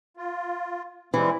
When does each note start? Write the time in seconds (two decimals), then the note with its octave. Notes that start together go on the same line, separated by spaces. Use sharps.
0.17 F4
1.14 E3 G3 G#3 C4